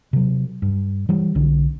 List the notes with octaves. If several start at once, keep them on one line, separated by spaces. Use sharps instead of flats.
C3 F#3
G2
E3 G3
B1 D3